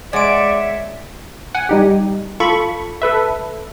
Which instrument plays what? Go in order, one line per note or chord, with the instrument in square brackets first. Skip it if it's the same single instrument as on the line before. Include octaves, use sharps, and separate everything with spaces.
[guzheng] G#3 [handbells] C#5 F#5 D7 [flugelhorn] D5 [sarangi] E5
[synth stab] F#5 G#5
G3 D#4 G4
F4 A4 B5 C#6
A4 B4 E5